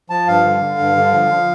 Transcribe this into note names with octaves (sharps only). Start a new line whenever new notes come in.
F3 A5
G2 F5
D3
D3
G2
D3
F3
F3